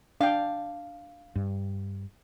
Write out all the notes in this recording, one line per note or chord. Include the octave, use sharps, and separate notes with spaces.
D4 F5 G5
G2